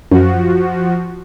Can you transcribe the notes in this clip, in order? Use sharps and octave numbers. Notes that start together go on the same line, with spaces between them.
F#2 F3 F#4